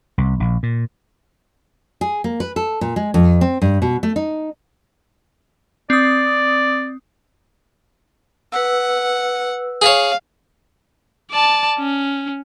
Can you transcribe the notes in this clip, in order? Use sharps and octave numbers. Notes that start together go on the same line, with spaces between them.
C2
A#1
A#2
G#4
A#3
B4
A4
A#2
G#3
F2
C4
G2
B2
A3
D#4
C4 D5 D#6
B4 F#5 E6
G#4 C#5 F5
D5 A5
C#4